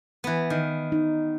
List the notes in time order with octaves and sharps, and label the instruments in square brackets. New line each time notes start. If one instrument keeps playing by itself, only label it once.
[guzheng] E3 B3
D#3
[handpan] D#4